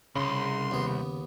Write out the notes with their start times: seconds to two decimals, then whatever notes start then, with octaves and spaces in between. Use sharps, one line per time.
0.15 C2 G2 C#3 C6
0.71 D#2 B3